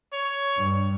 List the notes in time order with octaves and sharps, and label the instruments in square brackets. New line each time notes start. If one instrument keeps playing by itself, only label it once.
[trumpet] C#5
[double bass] G2